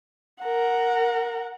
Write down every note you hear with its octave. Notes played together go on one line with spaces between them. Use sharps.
A#4 F#5